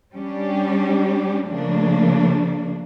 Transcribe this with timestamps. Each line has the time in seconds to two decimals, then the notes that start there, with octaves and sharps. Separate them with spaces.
0.14 G3 C#4 D4 G4
1.48 C#3 F3 A3 A#3 D4